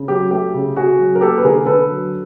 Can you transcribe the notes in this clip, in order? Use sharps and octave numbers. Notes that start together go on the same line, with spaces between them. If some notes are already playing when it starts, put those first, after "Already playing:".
Already playing: C#3
F#3 G4
A3 G4
C#3
C#3 F#4 G#4
F#3
A#4
A#3 G4 A4
B4
D3 G#4 A#4
D3 A4 B4
F#3